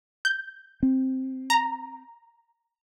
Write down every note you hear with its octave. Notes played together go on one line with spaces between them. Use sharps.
G6
C4
A#5